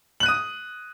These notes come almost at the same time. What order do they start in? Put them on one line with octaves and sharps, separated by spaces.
F#7 F#6 D#7 D#6